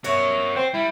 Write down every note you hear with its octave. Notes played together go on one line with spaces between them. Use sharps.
B2 F#4 A#4 C#5 E5
C4 C5
G3 E4